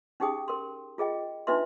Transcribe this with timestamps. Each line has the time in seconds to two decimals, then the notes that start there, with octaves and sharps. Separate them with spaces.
0.20 C#4 D#4 G4 G#4 G5 D#6
0.48 A#4 C6
0.98 F4 G#4 D#5 G5
1.47 D4 D#4 F4 B4 E5 C6